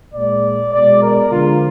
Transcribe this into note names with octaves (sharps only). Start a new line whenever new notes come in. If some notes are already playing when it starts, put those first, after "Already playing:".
A#2 G#3 D5
B2 G#3 D5
A#4
D3 F3 G#3 F4